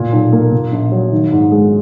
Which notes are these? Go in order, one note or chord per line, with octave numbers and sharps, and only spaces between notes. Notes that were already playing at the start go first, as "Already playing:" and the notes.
Already playing: A#2
B1
A#3
A#2
A#1
F#3
D#3
G#2
G#3